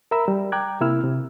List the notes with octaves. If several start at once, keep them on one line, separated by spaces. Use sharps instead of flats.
A#4 E5 A#5 B5 E6
G3
G5 A#5 D6 F#6 G#6
C3 A#3 E4 E6 F6
C3